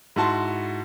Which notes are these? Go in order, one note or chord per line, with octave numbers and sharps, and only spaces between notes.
G#2 E4 F#4 A5 C6